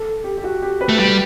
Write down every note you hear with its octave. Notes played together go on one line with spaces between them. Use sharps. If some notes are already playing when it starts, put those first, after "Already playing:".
Already playing: A4
G4
G4
F#4
G4
B4
A3
G3